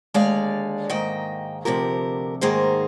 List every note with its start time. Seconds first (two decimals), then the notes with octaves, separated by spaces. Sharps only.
0.14 D#2 D3 G#3 D5 F5
0.89 G#2 D#3 A#3 D#5 G5
1.65 D2 C3 F3 G4 A#4
2.41 G#2 D#3 A#3 G#4 C5